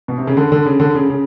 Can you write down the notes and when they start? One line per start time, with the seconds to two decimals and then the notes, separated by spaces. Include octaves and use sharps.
0.08 B2
0.18 C3
0.27 C#3
0.37 D3
0.52 D3
0.66 C#3
0.80 D3
0.95 C#3
1.10 C#3